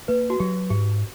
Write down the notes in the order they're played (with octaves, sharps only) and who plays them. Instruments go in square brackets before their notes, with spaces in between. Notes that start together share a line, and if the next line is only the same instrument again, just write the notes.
[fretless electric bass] A#3 [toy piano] B4
[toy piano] F#4
[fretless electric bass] F#3 [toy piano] G4
[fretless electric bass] G#2 [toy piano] G4